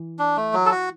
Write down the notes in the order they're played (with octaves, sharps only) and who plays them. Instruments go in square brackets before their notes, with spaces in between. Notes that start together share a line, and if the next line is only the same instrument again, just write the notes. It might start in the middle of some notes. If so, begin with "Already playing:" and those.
Already playing: [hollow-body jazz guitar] E3
[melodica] D4
A3
F#3
A4
F#4